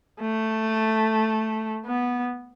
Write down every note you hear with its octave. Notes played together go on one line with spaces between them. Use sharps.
A3
B3